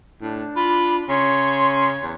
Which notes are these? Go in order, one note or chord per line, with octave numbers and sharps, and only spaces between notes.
A2 D4
F4 B5
C#3 C#5 C6
E2